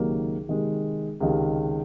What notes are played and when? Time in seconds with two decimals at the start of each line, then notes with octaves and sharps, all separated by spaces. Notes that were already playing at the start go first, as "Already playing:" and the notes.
Already playing: C#2 C3 D#3 F#3 A#3
0.48 C3 D#3 G#3
1.20 C#2 C3 D#3